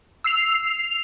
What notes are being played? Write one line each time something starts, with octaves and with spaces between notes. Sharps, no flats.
E6 C7 F7